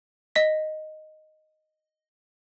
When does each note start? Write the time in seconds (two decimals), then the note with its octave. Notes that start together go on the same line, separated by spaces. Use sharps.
0.36 D#5 B6